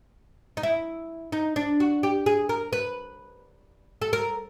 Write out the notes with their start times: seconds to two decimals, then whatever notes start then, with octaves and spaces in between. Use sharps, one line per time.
0.57 D#4
0.63 E4
1.32 D#4
1.56 D4
1.80 F#4
2.03 G4
2.26 G#4
2.49 A#4
2.73 B4
4.02 A4
4.13 A#4